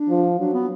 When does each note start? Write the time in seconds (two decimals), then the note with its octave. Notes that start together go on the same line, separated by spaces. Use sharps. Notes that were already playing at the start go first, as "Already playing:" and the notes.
Already playing: D4
0.09 F3
0.39 F#3 D4
0.54 B3